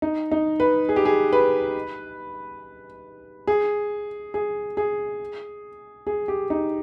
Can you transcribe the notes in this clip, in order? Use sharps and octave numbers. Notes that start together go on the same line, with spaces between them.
D#4
D#4
B4
G#4
G4
G#4
B4
G#4
G#4
G#4
G#4
G4
D#4